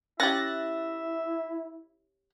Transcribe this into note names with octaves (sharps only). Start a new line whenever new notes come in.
C#4 E4 G4 E5 F#6 A6 A#6